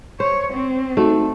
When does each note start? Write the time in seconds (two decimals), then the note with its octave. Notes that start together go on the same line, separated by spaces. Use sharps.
0.20 C5 C#5
0.53 C4
0.97 A3 D#4 F#4